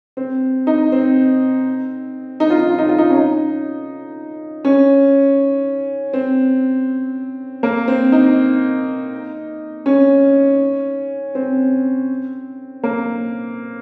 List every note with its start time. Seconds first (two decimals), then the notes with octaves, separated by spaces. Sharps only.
0.17 C4
0.67 D#4
0.92 C4
2.40 D#4
2.50 F4
2.60 D#4
2.70 F4
2.79 D#4
2.89 F4
2.98 D#4
3.10 C#4
3.16 D#4
4.65 C#4
6.13 C4
7.63 A#3
7.88 C4
8.12 D#4
9.86 C#4
11.35 C4
12.83 A#3